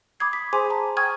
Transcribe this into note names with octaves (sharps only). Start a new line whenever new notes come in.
B5 D6 D#6 G#6 C7
B5 B6
G#4 C5 G#5 C6 D6
A5 A#5
G5 G#5 C#6 D#6 F6 G#6